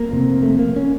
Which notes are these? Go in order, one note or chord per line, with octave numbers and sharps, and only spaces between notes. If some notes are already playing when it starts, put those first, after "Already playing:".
Already playing: A#3
F1 F2 C3
A3
A#3
C#4